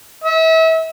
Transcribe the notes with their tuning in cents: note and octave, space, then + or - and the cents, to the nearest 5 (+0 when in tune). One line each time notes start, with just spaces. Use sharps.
E5 -35